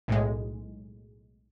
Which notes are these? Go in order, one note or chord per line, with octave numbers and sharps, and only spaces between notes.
B1 A2 G#3